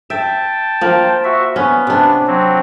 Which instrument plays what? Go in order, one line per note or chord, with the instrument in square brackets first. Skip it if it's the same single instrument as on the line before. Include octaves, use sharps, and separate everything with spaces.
[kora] E5 [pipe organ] G5 A5
[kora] F3 A#3
[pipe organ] F#4 E5
[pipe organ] B3 [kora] C#4
[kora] C3 D4
[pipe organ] F#3 C4